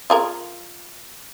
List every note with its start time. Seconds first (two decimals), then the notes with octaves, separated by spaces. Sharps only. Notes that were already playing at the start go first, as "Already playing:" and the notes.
0.10 F4 G#4 A#4